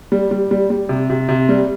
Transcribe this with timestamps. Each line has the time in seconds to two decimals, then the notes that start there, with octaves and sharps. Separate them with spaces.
0.12 G3
0.31 G3
0.51 G3
0.70 G3
0.89 C3
1.10 C3
1.29 C3
1.49 G3